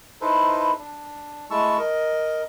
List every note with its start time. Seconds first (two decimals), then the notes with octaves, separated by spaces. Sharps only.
0.21 D#4 E4 A4 B4 C5
0.78 D4
1.51 G#3 A3 E4 A5 C#6 E6
1.78 A#4 D#5